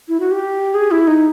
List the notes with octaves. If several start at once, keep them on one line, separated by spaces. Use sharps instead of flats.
E4
F#4
G4
G#4
E4
D#4